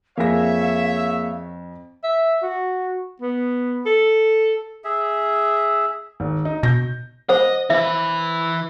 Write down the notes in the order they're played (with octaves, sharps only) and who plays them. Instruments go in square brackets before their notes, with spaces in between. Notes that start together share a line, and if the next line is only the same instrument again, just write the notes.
[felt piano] F2 A#6 [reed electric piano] A#3 G#4 [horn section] C#5 E5 [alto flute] F5
[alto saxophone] E5
F#4
B3
A4
[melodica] G#4 E5
[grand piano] G#1
D#4
[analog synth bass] B2 [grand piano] G6 A#6
[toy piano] C5 F#5 [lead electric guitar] D#5
[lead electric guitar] E3 B4 [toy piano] E5